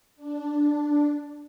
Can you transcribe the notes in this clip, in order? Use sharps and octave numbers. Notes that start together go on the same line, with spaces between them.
D4